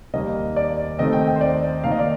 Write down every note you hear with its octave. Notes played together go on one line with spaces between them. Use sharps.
D#2 D#3 G3 A#3 D#5
D5
D#2 D#3 A3 C4 D#5
G5
G5
C5
D5
D#2 D#3 A#3 F5
D#5
D5